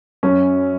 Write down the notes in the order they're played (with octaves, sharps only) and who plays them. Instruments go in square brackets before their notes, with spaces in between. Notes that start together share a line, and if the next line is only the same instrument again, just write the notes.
[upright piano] F#2 C#4